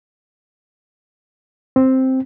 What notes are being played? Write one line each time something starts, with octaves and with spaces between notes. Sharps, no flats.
C4